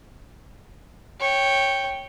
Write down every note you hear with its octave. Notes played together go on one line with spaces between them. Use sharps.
C#5 G5